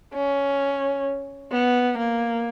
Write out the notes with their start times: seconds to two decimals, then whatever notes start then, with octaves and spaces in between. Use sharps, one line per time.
0.14 C#4
1.52 B3
1.98 A#3